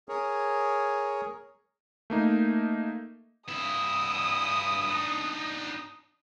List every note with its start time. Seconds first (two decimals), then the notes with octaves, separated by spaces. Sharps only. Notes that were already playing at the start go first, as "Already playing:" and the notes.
0.09 G#4 A#4 C#5
2.10 A3 A#3 D#4
3.49 G2 E4 D#6
4.90 D4 D#4